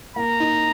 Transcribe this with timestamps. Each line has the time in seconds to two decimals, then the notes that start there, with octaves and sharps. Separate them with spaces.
0.16 A#3 A#5
0.40 D#4